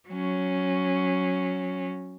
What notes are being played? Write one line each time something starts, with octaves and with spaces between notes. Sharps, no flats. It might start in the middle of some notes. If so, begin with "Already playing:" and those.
F#3 C#4